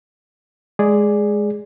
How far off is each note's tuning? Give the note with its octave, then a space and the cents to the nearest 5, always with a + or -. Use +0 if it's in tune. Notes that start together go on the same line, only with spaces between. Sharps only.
G#3 +0 G#4 +0 D5 +0